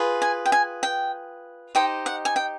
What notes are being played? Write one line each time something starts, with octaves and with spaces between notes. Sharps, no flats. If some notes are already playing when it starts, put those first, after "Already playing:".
Already playing: F4 G#4 B4
G#5
G5
G#5
G5
D#4 G4 C5 D#5 G5
F#5
G#5
G5